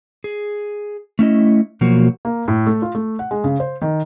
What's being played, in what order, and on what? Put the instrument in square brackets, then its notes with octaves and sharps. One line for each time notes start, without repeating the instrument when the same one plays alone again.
[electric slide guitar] G#4
A3 C#4 E4 D#5
B2 F3 F#3 A#3 F#4
[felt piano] A#3
A2
A3
F4
A3
F#5
G#3
C#3
C5
D#3